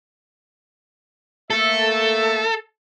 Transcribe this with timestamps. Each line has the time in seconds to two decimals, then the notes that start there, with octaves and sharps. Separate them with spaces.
1.50 A3 A#3 A4 E5